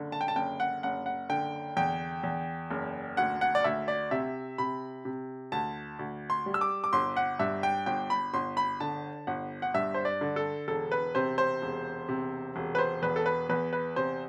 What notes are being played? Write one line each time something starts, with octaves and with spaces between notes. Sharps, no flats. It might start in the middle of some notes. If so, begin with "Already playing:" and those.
Already playing: F#1 D3
A5
G5
A5
F#1 G5
F#5
F#1 F#5
F#5
D3 G5
E2 G5
E2
F#1
D2 F#5
F#5
D5
D2 E5
D5
C3 E5
C3 B5
C3
D2 A5
D2
C6
G3
E6
D6
D6
G1 C6
F#5
G2 E5
G5
G1 G5
B5
G1 C6
B5
D3 A5
G1 F#5
F#5
G2 E5
C5
D5
D3
A4
E1 A4
B4
C3 C5
C5
E1
C3
E1
B4
C5
E2 B4
A4
B4
E2 B4
B4
C3 C5